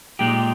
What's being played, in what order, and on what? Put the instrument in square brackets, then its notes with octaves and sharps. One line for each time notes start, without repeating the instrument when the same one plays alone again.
[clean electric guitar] A#2 G#3 D#4 G4